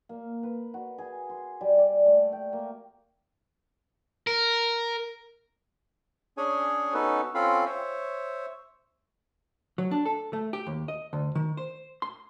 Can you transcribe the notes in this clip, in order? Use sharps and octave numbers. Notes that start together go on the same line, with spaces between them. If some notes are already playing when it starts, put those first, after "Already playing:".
A#3
B4
F#4
G#4
C6
G3
D5
A3
G5
A#3
A#4
C#4 D4 G#4 C#5 G#5
B3 C#4 D#4 F#4 A4 B4
C4 C#4 F4 A4 F5 B5
C5 C#5 E5
F#3
D4
A4
A3
G4
D#2
D#5
D2
D#3
C5
C6